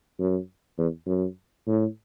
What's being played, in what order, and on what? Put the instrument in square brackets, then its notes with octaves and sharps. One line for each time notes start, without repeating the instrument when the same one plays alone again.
[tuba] F#2
E2
F#2
A2